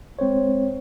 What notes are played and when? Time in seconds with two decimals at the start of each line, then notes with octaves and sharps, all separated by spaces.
0.19 G#3 C4 C5 C#5